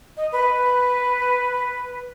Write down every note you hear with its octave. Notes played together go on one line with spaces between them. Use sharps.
D#5
B4